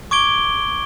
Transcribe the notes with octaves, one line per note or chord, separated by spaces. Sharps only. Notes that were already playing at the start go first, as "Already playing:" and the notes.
C#6 D6 G#6 D7 G7